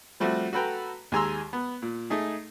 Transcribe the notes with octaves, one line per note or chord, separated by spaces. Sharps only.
F3 G3 A3 C4 F#4
F#4 A4 B4 G5 A#5
D#2 G#3 G#5 A#5 C6 E6
B3
A#2
A3 D#4 G#4